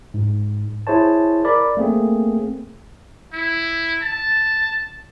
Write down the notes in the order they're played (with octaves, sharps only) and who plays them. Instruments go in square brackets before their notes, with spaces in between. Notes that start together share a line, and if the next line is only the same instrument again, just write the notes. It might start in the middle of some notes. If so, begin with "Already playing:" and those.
[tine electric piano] G#2
E4 G#4 C5 C#5 A5
A#4 D5 B5
A3 A#3 C4 G#4
[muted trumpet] E4
A5